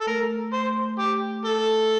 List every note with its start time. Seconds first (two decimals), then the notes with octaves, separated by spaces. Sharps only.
0.01 A4
0.07 A3 A#4
0.53 C5
0.99 G4
1.45 A4